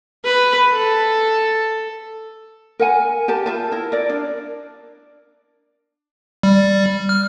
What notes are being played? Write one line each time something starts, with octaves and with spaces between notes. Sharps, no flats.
B4
A4
A#4 F#5 G#5
G4 A#4 A5
F4 E5 A5
E4 A#4
A#4 D5
D4
G3
F6